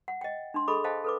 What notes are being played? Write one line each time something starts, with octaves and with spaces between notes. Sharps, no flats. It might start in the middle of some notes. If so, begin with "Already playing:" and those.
F#5
D#5 G5
D4 C6
G#4 A4 D#5 B5 D6
C5 D#5 F5 G5 A5
A4 B4 D6